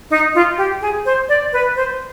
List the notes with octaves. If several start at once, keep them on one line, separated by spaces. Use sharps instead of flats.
D#4
F4
G4
G#4
C5
D5
B4
C5